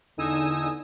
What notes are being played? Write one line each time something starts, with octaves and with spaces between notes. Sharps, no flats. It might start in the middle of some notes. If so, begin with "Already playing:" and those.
E2 D3 D#4 G#5 D#6 E6